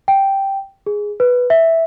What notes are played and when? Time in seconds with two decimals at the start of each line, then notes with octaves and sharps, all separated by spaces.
0.08 G5
0.86 G#4
1.20 B4
1.50 E5